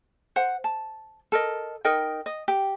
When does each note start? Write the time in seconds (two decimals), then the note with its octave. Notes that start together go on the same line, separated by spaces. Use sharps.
0.36 C5 F#5
0.64 A5
1.32 A4 A#4 D#5
1.85 D#4 A#4 D#5 G5
2.26 D#5
2.48 G4